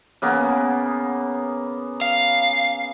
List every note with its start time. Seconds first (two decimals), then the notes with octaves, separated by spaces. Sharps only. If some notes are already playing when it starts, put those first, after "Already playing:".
0.22 C#3 A#3 B3
2.01 F5